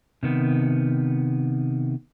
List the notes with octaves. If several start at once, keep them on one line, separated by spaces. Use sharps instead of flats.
C3 D#3 B3